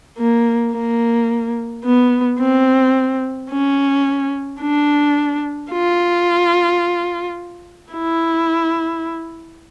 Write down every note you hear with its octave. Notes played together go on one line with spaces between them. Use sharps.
A#3
A#3
B3
C4
C#4
D4
F4
E4